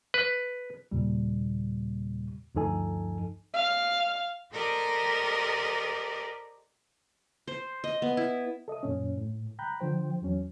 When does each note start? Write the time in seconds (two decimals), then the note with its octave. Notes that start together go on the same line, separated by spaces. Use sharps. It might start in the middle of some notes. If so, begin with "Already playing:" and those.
0.14 B4
0.91 D#2 A#2 C#3 G3
2.55 D2 G2 F3 D#4 A4 G#5
3.54 F5
4.51 G4 A4 A#4 C5 D5 D#5
7.47 C5
7.84 D#5
8.02 B3
8.17 E4
8.68 A4 D#5 E5 D#6
8.83 F#2 A#2 C#4
9.18 A2
9.59 G5 A#5 B5 F#6 G6
9.80 D3 F3 C5 G5
10.22 E2 F#3 C#4